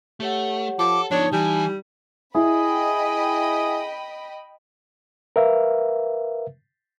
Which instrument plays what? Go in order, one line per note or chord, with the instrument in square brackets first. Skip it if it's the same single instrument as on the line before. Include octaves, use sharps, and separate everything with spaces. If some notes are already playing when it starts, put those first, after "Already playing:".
[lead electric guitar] A3 [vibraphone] G4 C#5 F#5
[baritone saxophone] F3 [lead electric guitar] A4 [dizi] D6
[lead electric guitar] F3 B3 [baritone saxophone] D4 [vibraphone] D#4 A5 [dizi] C#5
[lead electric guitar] E3 [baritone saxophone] G3 [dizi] G#5
[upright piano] E4 [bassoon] G#4 [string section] D#5 G5 B5
[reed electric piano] A#4 B4 E5 F5